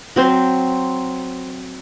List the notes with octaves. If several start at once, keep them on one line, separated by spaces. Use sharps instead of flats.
F#3 C4 C5